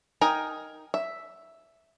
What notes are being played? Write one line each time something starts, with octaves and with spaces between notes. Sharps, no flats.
D#4 A#4 D#5 G5 G#5
E5